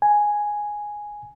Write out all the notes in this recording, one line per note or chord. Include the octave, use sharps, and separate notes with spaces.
G#5